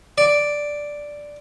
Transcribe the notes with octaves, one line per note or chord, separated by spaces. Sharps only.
D5